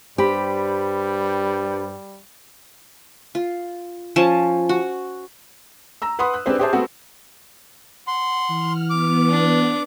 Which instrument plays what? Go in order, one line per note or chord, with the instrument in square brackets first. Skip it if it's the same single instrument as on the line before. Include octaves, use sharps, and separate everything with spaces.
[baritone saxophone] G2 [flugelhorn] G3 [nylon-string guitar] G4 [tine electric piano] C5 B5
[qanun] F4
F3 C#4 A5
F#4
[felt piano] A#5 E6
B4 F#5 B5 C6 D#6
F#6
C4 D4 G4 G#4 B4 C5
G4 G#4 C5 E5 A5
A3 B3 C4 F#4
[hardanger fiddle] F#5 [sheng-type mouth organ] C6
[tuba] E3 [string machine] F6
[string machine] B3 [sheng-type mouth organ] D6
[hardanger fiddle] D4